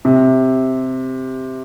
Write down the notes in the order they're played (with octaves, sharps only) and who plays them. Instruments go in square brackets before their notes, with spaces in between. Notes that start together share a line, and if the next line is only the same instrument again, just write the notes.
[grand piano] C3